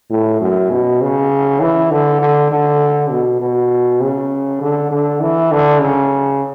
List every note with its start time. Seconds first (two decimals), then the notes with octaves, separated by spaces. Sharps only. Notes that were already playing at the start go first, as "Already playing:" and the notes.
0.10 A2
0.41 F#2
0.71 B2
1.01 C#3
1.60 E3
1.91 D3
2.21 D3
2.51 D3
3.11 B2
3.41 B2
4.01 C#3
4.61 D3
4.91 D3
5.21 E3
5.52 D3
5.81 C#3